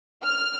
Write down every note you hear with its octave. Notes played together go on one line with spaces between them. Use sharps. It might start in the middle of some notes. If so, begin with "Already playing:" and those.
F6